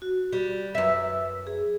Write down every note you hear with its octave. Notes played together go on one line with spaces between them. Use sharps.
F#4
G3
F#2 B4 E5 E6
G#4